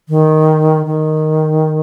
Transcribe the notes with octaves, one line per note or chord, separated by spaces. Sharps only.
D#3
D#3